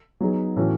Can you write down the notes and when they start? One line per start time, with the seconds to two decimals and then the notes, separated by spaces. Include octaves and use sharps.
0.20 F#3 B3 D#4 G#4
0.57 A2 E3 A3 C#4 F#4